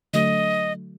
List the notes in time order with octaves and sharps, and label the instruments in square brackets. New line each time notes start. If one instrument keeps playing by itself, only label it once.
[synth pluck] D3 F#3 A3 [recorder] D#5